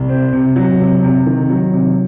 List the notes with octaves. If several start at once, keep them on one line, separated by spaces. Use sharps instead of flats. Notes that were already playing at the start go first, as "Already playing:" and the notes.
Already playing: C2
C4
C3
F#3
C3
C3
D#3
F#3
C3